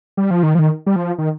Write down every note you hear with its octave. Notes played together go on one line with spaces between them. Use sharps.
G3
F3
D#3
F3
D#3
G3
F3
D#3